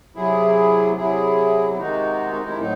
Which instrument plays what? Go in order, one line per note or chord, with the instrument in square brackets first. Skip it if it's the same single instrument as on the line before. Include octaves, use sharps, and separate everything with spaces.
[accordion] C3 F#3 E4 G#4
C3 F#3 E4 G#4
E4
C3 D#3 G#3 D#4 F#4
F#4
E4
A2 F#3 C4 D#4